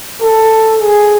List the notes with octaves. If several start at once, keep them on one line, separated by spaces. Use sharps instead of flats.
A4
G#4